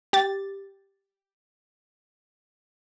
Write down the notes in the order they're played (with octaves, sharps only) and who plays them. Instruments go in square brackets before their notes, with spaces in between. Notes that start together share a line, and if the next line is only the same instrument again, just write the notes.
[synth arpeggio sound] G4 A6